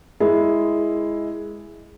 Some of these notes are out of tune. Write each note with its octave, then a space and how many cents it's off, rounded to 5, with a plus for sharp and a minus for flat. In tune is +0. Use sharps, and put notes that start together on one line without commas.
G#3 +0 E4 +0 A#4 +20